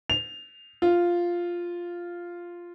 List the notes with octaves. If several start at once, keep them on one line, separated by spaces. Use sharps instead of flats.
F7
F4